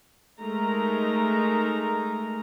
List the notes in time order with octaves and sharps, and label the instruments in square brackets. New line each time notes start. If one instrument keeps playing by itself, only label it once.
[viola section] G#3 A3 D#4 A#4 A#5